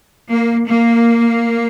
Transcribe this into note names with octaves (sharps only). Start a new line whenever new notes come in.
A#3
A#3